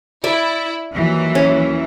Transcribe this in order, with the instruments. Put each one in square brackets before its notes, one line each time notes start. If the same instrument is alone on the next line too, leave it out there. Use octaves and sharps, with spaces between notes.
[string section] E4 [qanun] D5 E5
[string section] D#2 E3 F#3
[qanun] C#4